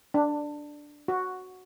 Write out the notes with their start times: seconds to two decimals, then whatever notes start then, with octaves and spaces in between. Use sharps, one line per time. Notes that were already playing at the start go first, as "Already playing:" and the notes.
0.14 D4
1.08 F#4